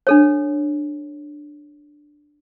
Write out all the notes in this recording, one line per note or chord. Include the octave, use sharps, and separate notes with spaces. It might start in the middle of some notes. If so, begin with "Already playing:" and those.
D4 A4 C#5